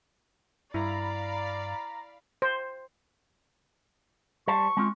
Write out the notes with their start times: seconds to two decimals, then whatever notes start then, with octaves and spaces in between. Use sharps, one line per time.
0.74 G2 E4 D5 F5 A#5 B5
2.42 C5
4.48 G3 C5 A5 C#6
4.77 G#3 C4 F4